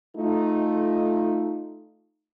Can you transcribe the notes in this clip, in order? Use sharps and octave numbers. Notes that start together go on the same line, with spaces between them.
A3 D#4 F4